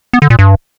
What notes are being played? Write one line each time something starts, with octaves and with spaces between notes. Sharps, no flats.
B3
D3
A#2
G2